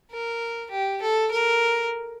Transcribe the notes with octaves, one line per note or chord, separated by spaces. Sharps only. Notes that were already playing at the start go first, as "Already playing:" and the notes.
A#4
G4
A4
A#4